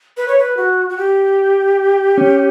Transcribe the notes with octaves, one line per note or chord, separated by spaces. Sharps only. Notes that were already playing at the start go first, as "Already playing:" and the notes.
B4
C#5
B4
F#4
F#4
G4
C#4